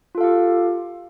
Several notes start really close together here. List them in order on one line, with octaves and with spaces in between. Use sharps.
F4 A4 F5 G4